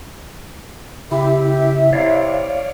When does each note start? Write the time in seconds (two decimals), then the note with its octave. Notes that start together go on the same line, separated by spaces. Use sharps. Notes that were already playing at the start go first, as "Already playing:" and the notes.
1.11 C#3 E4 G4 E5
1.93 C3 E4 C#5 D5 F5